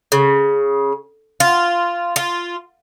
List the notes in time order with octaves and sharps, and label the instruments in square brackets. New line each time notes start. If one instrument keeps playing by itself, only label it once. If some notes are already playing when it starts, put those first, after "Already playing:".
[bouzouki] C#3
F4
F4